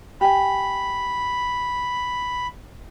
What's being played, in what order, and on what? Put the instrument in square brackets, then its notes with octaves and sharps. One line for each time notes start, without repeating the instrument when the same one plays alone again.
[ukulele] G4 G#5 [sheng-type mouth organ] B5